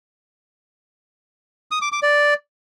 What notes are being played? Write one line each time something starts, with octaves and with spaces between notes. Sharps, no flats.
D#6
D6
D6
D5